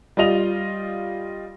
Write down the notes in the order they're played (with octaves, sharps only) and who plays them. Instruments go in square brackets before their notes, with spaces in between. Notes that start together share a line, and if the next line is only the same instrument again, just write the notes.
[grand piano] G3 F4 D#5 F7